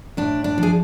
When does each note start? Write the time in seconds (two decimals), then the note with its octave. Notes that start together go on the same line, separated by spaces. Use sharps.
0.17 A2 D4
0.44 D4
0.58 F3
0.63 G#4